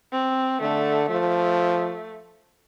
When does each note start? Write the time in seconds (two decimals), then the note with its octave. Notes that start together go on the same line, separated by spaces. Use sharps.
0.12 C4
0.61 D3 A3
1.08 F3 A3